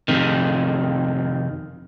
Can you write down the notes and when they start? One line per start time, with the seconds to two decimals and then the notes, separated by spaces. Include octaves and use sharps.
0.08 F2 C3 D#3